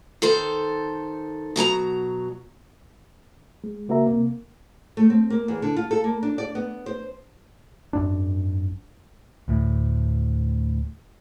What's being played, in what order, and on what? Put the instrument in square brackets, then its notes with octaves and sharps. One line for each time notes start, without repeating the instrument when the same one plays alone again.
[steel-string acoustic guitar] D#3 A4 C5
B2 F#3 G#5 A#5
[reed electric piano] G#3
C#3 A#3 F#4 A#4 E5 A#5
C3 A#3
[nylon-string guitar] A3
C4
A#3
E2
D3
F4
A4
A#3
D4
D5
B3
C5
[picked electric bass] G#1 F#2 D4
D2 A2